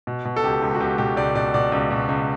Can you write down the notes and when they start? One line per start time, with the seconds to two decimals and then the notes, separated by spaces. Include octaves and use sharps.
0.07 B2
0.25 B2
0.36 A4
0.44 C#2 G4
0.62 C#2
0.75 F#4
0.80 C#2 G4
0.98 B2 G4
1.17 C#2 D5
1.35 B2 D5
1.54 B2 D5
1.72 C#2
1.91 B2
2.09 C#2